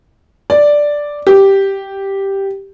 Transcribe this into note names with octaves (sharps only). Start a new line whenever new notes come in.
D5
G4